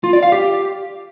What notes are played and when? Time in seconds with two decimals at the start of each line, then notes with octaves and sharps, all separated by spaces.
0.04 F4
0.13 D5
0.23 F5
0.32 G4